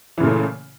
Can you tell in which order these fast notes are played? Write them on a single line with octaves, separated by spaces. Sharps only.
E3 C#3 A#2 A3